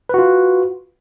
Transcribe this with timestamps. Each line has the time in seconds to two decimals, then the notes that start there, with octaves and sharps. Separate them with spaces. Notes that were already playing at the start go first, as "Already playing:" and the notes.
0.09 B4
0.14 F#4
0.18 F4